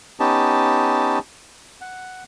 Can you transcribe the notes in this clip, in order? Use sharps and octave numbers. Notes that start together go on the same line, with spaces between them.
B3 C#4 D#4 G4 A5
F#5